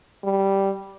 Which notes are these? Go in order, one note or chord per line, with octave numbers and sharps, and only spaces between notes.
G3